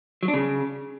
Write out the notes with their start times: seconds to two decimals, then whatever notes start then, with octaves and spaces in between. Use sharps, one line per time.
0.23 F#3
0.28 D4
0.34 C#3